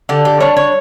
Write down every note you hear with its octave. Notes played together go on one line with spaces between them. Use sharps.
D3 G4
G4
G3 D4 C#5
C#5